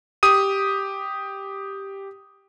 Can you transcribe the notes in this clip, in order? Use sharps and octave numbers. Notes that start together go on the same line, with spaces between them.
G4 D#6 D#7